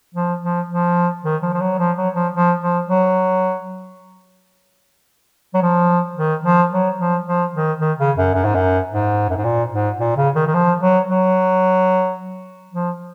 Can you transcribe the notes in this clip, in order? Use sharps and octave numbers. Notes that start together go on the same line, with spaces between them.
F3
F3
F3
D#3
F3
F3
F#3
F3
F#3
F3
F3
F3
F#3
F#3
F3
D#3
F3
F#3
F3
F3
D#3
D#3
C#3
F#2
F#2
G#2
F#2
G#2
F#2
G#2
A#2
G#2
A#2
C#3
D#3
D#3
F3
F#3
F#3
F3